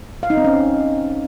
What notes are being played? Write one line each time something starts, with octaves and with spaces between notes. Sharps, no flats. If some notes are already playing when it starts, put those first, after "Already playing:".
F5
D#4
C4
C#4